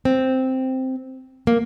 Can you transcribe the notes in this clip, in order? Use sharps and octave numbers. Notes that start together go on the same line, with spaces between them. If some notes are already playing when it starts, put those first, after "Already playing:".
C4
A#3